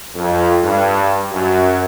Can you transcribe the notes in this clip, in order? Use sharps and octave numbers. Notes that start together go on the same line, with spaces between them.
F2
G2
F#2